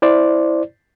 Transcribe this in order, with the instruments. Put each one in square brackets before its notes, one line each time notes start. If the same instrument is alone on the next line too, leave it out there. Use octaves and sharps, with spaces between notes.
[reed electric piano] E4 C5 D5